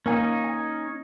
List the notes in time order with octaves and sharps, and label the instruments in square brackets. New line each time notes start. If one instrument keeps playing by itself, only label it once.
[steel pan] A#3 G#5 [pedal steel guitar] C#4 D#4
[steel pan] G#5